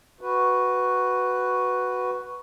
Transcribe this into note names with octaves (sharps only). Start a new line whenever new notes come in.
F#4 B4